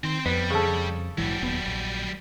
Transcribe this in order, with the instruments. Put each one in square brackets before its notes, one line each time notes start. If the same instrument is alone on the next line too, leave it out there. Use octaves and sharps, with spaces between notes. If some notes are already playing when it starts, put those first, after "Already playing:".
[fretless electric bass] D#3 [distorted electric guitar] C4 C6
[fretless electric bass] F2 [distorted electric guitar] G3 [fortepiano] B3
[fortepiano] C#3 A4
[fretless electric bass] A#1 G#2 E3 [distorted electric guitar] F#3 G3
[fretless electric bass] D#1 D#2 B3
A#1